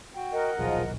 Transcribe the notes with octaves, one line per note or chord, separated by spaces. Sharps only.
F#4 G5
A#4 D#5 F#5
D#1 B1 F3 F4 G#4